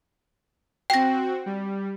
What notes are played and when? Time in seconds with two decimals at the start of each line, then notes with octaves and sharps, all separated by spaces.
0.90 C4 F#4 G5 A#6
1.46 G3